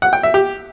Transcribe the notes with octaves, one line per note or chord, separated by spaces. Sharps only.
F#5
G5
E5
G4